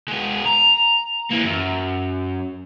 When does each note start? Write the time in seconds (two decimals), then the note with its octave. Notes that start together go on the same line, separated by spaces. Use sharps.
0.08 G#3 B3
0.46 A#5
1.30 E3 A#3
1.45 F#2